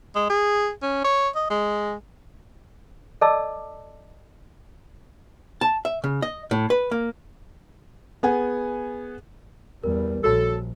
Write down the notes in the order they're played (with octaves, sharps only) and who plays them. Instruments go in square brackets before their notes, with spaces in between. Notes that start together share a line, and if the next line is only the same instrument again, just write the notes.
[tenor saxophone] G#3
G#4
C#4
C#5
D#5
G#3
[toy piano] A4 D5 D#5 A5 D6 E6
[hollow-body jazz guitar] A5
E5
C#3
D#5
A2
B4
A#3
[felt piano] B3 G#4 F#5 G#5
[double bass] E2 G3 [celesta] A#4
[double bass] A#1 [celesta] F#4 C#5 [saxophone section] A4